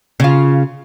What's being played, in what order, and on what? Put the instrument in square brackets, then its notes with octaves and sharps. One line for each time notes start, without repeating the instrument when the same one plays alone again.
[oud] C#3 F4